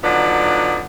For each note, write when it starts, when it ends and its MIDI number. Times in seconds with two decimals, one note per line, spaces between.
0.04 0.83 50
0.04 0.83 54
0.04 0.83 59
0.04 0.83 63
0.04 0.83 65
0.04 0.83 74